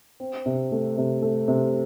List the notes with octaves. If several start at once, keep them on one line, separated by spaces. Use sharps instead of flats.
C4
C3
A3
C3
A3
C3